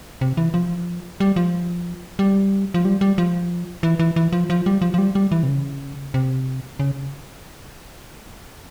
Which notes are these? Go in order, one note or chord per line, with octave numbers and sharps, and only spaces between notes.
C3
E3
F3
G3
F3
G3
F3
G3
G3
F3
E3
E3
E3
F3
F3
G3
F3
F3
G3
G3
E3
C3
C#3
C3
C#3